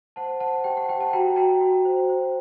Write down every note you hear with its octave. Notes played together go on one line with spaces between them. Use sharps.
C5 F#5 A5
C5 F#5 A5
G4 G5
F#5
G4 G5
F#5 A5
F#4 G5 A#5
F#4 G5 A#5
F#4
C5
C5